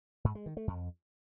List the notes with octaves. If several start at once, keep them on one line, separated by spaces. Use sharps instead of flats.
G#2
G#3
D#3
A3
F2